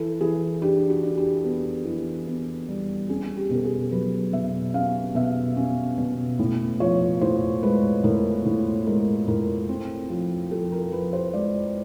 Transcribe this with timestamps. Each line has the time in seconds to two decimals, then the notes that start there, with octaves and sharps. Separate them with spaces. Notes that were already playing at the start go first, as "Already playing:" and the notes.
Already playing: E3 A4
0.21 E3 G#4
0.62 D4 G4
0.90 F#4
1.03 D4
1.17 G4
1.45 B3
1.85 E3
2.27 B3
2.68 G3
3.09 C#4 G#4
3.37 G4
3.50 B2 A4
3.64 G#4
3.92 F#3 B4
4.33 B2 E5
4.74 C#4 F5
5.15 B2 E5
5.57 C#4
5.98 B2
6.39 A2
6.80 F3 C#5
7.21 A2 C5
7.63 G#3 B4
8.04 A2 A#4
8.45 A2
8.87 G#3 A#4
9.28 A2 A#4
9.69 C4
10.10 F3
10.51 F3 A4
10.72 A#4
10.92 F3 B4
11.13 C5
11.34 G#3 D5